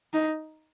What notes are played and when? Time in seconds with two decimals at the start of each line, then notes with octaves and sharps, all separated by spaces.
0.13 D#4